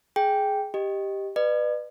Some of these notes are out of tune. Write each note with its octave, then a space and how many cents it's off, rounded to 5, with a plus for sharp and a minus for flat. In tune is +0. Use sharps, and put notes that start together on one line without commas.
G#4 +15 G5 +0
G4 +0 D#5 +0
B4 +0 D5 +45